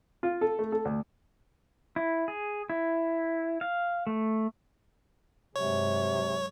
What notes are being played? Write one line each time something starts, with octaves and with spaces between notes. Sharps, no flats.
F4
A4
A3
A4
D2
E4
G#4
E4
F5
A3
G2 C3 F#3 G#3 C#5